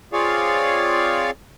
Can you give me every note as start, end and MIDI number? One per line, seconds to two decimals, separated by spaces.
0.13 1.31 60
0.13 1.31 65
0.13 1.31 68
0.13 1.31 73
0.13 1.31 74
0.13 1.31 77